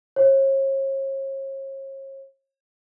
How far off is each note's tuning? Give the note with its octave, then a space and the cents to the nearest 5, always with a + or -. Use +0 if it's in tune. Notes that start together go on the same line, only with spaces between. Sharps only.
C#5 -40